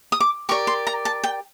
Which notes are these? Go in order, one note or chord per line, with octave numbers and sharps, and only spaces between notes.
D#6
D6
G4 A#4 D5 C#6
C6
A#5
A5
G5